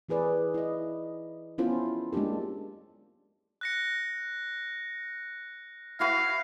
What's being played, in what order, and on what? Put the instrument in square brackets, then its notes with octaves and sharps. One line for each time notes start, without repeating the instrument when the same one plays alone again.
[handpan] E3 E4 G#4 B4 D5
E4 D#5
B3 C#4 E4 F4 A4 C5
G#3 A#3 D4 G4 A4
[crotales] F#6 A#6 C#7
[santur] E4 F#4 B4 [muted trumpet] F5